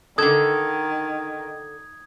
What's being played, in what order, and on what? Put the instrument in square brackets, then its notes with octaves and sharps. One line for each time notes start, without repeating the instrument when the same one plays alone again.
[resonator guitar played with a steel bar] D3 A4 [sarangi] D#3 [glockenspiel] D#6 G#6